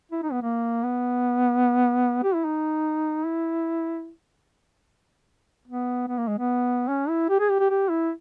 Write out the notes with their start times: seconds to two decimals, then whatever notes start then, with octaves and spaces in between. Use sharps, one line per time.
0.12 E4
0.23 D#4
0.32 B3
0.42 A#3
0.84 B3
2.24 G4
2.34 E4
2.44 D#4
3.25 E4
5.68 B3
6.08 B3
6.18 A#3
6.28 G#3
6.38 B3
6.88 C#4
7.09 E4
7.29 G4
7.40 G#4
7.49 G4
7.60 G4
7.70 G4
7.90 E4